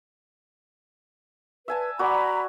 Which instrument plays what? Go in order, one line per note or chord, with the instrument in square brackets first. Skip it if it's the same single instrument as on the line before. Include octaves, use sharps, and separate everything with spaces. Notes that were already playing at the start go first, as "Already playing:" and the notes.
[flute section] B4 [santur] E5 G#5 A5
[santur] F#4 B4 D5 [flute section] A#5 B5